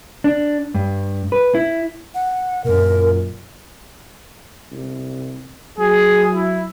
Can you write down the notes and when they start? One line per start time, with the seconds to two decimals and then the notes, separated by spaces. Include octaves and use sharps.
0.24 D4
0.74 G2
1.32 B4
1.55 E4
2.14 F#5
2.64 F#2 A#2 A#4
4.72 C2
5.78 F#3 G#4
6.34 E4